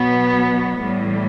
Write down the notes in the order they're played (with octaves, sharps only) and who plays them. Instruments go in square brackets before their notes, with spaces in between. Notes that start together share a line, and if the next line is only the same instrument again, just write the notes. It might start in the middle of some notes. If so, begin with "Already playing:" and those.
Already playing: [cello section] B2 F#3 B3
A2 E3 G3